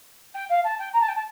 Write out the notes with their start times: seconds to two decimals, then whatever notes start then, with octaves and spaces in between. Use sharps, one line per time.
0.34 G5
0.49 F5
0.64 A5
0.78 G5
0.93 A#5
1.00 A5
1.08 G5
1.15 A5